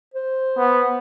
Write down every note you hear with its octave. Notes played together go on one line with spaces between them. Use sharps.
C5
B3